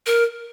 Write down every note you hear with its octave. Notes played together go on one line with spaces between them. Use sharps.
A#4